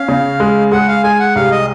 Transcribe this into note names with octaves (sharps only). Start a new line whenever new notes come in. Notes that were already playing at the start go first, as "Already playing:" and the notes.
Already playing: C#4 F5
C#3
G#3
G#3 F#5
F5
G#3 G#5
F#5
C2 F5
D#5